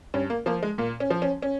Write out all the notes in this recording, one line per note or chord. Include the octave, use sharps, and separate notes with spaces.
G2 C#4
A#3
F3 A#3
G#3
A#2 A#3
C#4
F3
C#4
C#4